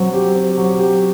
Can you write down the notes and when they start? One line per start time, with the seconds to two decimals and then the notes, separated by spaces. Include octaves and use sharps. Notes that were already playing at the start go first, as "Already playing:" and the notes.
Already playing: F#3 C4
0.13 G4
0.35 C4
0.57 F#3
0.79 G4